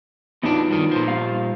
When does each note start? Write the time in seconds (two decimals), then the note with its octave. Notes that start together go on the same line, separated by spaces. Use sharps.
0.43 F2 B3 D4 D#4 F4
0.70 G2 D#3
0.92 A#2 F3
1.07 G3 F5